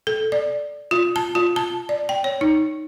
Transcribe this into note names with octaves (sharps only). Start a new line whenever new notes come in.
A4
D5
F4
A5
F4
A5
D5
G5
C#5
D#4